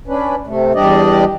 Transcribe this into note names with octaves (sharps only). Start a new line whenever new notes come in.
C#4 D4 B4
C3 A3
E2 G3 D4 G4 D5 D#5